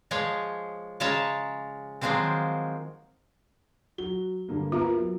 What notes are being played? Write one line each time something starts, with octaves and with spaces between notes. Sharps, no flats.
F3 G#3 G#4 C#5
C#3 G#3 C#4 C#5 A5 A#5
D#3 F3 F#3 G#3 A#3 C4
F#3 F#4 G7
G2 D3 A#3
B3 E4 F4 A#4
F#3